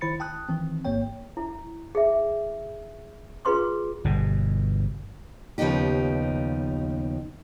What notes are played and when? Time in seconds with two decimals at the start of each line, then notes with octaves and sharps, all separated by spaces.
0.01 D#3 E4 C5 B5 A6 C#7
0.20 G5 A5 D#6 F#6
0.49 D#3 E3 C4
0.85 A1 G#2 A#3 C#5 G5
1.37 E4
1.95 G#4 E5
3.45 F4 G#4 B4 C6 D6
4.05 G1 B2
5.58 D#2 C#3 F3 B3 D#4 G4